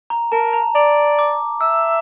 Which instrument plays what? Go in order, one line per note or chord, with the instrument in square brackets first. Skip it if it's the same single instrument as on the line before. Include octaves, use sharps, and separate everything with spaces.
[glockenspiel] A#5
[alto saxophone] A#4 [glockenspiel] A5
[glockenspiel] A#5
[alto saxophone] D5 [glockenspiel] A#5
[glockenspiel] D6
[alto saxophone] E5 [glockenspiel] E6